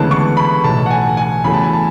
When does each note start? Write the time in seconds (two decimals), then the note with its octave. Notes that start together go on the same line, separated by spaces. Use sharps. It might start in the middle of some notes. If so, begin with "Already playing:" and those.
Already playing: D2 C#3 E3 G#3 B3 A5
0.11 C#6
0.37 B5
0.64 B1 A2 E3 A5
0.86 F#5
0.91 G#5
1.17 G#5
1.44 E2 C#3 F#3 A3 B5
1.54 A5
1.63 G#5
1.73 A5